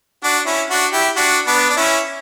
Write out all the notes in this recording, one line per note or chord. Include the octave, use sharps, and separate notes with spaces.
D4 F#4
C#4 E4
D4 F#4
E4 G4
D4 F#4
B3 D4
D4
C#4 E4